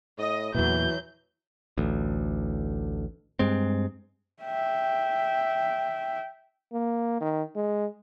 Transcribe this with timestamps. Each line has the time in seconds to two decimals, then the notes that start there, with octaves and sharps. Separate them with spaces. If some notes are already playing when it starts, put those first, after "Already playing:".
0.18 A2 D#5
0.55 E2 A#2 E3 F#3 G6
1.78 A1 D2
3.39 G2 G#3 C4
4.43 E5 G5
6.73 A#3
7.21 D#3
7.55 G#3